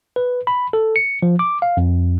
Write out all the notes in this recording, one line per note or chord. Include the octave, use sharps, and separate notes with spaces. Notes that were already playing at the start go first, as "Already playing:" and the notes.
B4
B5
A4
C#7
F3
D6
F5
F2